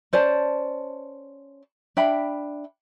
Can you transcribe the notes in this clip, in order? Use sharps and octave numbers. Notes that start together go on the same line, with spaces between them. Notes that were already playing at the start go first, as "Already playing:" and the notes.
C#4 C5 D5 A5
D4 E5 G5 B5